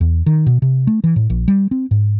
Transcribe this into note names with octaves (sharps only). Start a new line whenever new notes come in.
E2
D#3
B2
C3
A3
E3
A2
A#1
G3
C4
G#2